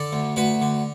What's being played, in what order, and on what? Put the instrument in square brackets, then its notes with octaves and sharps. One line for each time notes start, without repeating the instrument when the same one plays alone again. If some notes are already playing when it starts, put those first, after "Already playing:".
Already playing: [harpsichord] D3 A4 D5
D2
D2 F#4 B4
D3